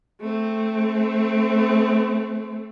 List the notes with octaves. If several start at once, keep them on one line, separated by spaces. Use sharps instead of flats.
A3 C4